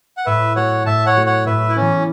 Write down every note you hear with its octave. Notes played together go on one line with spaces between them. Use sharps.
F#5
A2 B4 E5
A3 F#4 A4 C#5 F#5
A2 E5 A5
C#5 F#5
A3 F#4 A4
C#5 F#5
A2 B4 E5
E4
E3 B3 C#4